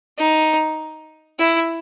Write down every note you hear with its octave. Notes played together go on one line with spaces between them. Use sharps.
D#4
E4